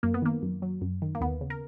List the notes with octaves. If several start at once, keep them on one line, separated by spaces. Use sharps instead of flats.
F#2 A#3
B3
D#3 A#3
F#2
F#3
F#2
D#3
A#3
D#2 B3
C#3
A#4